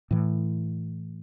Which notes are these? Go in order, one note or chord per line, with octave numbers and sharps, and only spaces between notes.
A2 E3